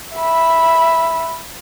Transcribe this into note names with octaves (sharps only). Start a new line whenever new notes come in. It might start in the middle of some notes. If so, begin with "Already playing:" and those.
E5 B5